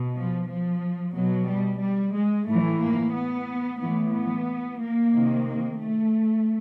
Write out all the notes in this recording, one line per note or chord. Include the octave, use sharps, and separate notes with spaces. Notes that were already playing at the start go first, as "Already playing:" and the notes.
Already playing: B2
F3
F3
B2 F#3
G3
G3
G#3
A2 E3 A3
A#3
B3
A2 E3 B3
B3
A#3
C3 D#3
A#3
A3